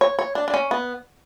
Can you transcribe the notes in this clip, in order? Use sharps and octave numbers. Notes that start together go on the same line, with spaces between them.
C#5
C#5
D4
D4
C#4
B3